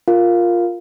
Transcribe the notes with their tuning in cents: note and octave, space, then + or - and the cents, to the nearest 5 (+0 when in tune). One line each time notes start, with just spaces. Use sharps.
F4 +0 A#4 -5 F5 +0